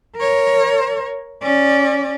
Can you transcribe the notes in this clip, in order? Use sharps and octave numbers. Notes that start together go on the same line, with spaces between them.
A#4 C#5
C#4 D5